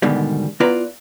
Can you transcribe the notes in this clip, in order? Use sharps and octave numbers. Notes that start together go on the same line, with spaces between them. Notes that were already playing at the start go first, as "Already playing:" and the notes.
G#2 B2 D3 D#3 G3
B3 E4 F4 B4 D5 A#5